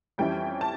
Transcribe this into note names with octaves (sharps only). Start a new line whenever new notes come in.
F2 E3 G3 C#4 E4 G5
A5